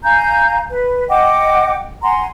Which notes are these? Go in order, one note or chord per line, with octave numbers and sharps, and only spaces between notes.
F5 G#5 A#5 G6
B4
D#5 F#5 G5 D6
F#5 G#5 A#5 C6